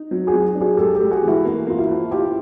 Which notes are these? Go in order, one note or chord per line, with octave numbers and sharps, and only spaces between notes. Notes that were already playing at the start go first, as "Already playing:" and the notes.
Already playing: D#4
F#3
F#4 G#4
F#3
D4
F#4 G#4
G#3 G4 A4
G4 A4
G#3
F#4 G#4
E3 E4 F#4
A#3
A#3 F4
E4 F#4
F3
E4 F4 G4